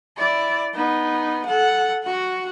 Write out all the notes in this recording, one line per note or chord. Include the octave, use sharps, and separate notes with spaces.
E4 D5
B3 D#4
A4 F#5
F#4 F#5